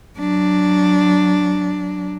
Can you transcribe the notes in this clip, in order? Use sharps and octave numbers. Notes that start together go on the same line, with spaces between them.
F#3 D4